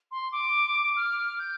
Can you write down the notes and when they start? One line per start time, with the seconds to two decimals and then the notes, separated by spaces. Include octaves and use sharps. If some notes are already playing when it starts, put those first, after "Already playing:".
0.11 C6
0.32 D6
0.96 F6
1.39 G6